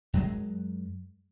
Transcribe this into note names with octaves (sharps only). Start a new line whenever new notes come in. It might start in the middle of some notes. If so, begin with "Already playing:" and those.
F#2 F#3 G#3